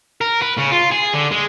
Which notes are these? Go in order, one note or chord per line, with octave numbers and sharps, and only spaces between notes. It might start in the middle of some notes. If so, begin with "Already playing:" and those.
A#4
B4
C#3
F4
G#4
D3
G#3